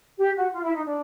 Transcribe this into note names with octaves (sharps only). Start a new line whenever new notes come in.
G4
F#4
F4
E4
D#4
D4